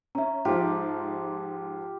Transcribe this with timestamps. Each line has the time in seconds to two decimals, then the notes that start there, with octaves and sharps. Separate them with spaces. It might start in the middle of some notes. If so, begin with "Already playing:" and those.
0.15 C#4 E5 A#5
0.45 G#2 F3 F4 G4 F5